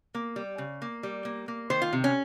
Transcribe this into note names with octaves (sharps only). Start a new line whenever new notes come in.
A#3
G3
C#3
A#3
G3
A#3
A#3
D#3 C5
F4
C3
C#4